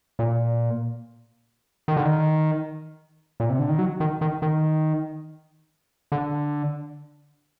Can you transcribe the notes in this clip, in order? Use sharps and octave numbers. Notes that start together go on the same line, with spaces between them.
A#2
D#3
D3
D#3
A#2
C3
D3
D#3
F#3
D#3
D#3
D#3
D3